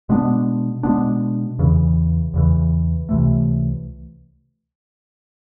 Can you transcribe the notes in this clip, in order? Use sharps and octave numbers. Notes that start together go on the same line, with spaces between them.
B2 G#3 B3 D4
B2 G#3 B3 D4
E2 C#3 E3
E2 C#3 E3
C#2 C3 E3 A3